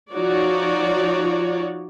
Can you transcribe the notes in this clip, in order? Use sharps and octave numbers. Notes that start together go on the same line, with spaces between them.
F3 D#4 F#4 C#5 D5